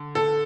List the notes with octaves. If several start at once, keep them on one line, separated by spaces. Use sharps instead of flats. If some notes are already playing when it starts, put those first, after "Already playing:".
Already playing: D3
A4